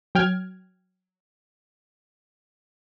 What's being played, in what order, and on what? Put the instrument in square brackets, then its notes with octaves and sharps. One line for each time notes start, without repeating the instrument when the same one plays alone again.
[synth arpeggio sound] F#3 G5 F6 G#6